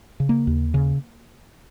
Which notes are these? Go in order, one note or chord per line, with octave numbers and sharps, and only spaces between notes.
C#3
A#3
D#2
C#3